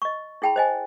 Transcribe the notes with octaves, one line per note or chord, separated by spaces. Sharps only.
D#5 C#6
E4 G#4 G5 A5 B5
C5 D#5 G#5